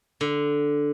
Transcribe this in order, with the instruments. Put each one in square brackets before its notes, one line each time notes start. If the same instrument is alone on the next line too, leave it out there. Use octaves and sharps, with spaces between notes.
[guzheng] D3